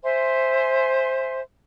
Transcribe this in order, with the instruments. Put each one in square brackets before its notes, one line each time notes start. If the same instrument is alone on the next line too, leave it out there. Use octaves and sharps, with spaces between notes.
[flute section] C5 E5 G#5 C6